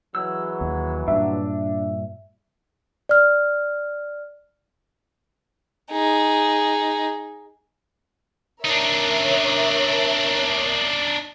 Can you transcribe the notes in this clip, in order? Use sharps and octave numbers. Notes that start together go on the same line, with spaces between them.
E3 F#3 G#3 E6
D#2
G2 A#2 D4 E5
D5 F6
D#4 G#4
D4 D#4 A#4 C#5 E5